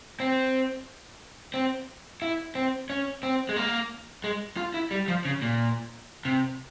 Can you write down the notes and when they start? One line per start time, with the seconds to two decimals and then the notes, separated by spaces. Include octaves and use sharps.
0.20 C4
1.54 C4
2.22 E4
2.55 C4
2.90 C#4
3.23 C4
3.49 G#3
3.56 A#3
4.24 G#3
4.57 F4
4.74 E4
4.91 G3
5.08 F3
5.25 C#3
5.42 A#2
6.25 C3